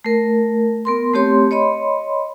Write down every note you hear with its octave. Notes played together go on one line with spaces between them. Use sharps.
A3 A#4
B3 A#4 C6
A3 C4 G4 C#5 C6
C#5 D#5 B5 C6